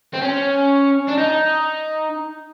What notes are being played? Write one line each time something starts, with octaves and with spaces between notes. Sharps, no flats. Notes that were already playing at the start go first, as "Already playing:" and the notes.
C4
C#4
D4
D#4